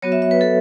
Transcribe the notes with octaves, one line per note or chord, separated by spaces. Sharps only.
F#3 B3 F#4 C#5
E5
E5
B4
A4